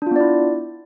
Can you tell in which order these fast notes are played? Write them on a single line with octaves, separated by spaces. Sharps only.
D4 F4 B3 D5 E4